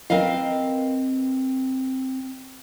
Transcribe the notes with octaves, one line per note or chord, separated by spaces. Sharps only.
C4 A#4 B4 D#5 F5